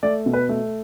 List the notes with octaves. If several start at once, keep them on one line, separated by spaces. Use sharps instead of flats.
A3 D5
B2
B4
A3